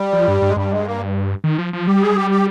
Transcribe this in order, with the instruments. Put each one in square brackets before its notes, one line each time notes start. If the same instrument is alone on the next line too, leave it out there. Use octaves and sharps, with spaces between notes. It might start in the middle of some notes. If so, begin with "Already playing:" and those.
Already playing: [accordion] G3
[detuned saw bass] F3
G2
G2
[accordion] G#3
[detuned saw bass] G2 [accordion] G3
[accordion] G#3
A#3
[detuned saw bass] D#3
F3
F3
[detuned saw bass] G3 [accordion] G4
[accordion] G#4
G4
G4